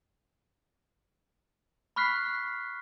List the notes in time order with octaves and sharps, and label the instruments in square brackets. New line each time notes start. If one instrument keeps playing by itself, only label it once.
[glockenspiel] B5 C#6 F6 F#6 B6 C7